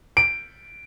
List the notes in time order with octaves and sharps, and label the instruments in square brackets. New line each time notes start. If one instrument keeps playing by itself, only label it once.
[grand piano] D7